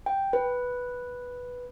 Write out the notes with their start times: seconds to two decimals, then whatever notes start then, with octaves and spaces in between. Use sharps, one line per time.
0.06 G5
0.33 B4